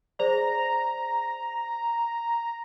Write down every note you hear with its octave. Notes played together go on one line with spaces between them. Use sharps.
G#4 C5 D5 A#5